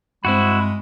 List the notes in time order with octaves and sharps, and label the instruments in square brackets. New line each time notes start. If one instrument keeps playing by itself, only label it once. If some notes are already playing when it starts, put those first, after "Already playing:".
[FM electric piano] G2 C4 [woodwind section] G#3 [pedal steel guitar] E4 F#4 [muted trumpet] B5